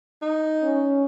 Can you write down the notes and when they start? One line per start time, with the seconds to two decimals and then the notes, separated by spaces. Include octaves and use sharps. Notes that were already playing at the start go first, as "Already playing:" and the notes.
0.22 D#4
0.63 C#4